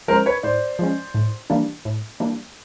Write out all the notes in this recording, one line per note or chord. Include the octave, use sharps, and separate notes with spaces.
F3 G#3 C#4 A#4 C5
B4 C#5
A2 C5 D5
F3 G#3 C#4
A2
E3 G3 A#3 D4
A2
E3 G3 A#3 D4